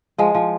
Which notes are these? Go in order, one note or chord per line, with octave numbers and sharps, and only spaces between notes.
F3 G#3
F3